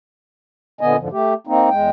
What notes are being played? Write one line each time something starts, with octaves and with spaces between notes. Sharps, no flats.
A#2 D3 B3 D#5 G#5
F2 G#2 D3 F3
A3 G4
A#3 C4 D#4
E2 G#3 G5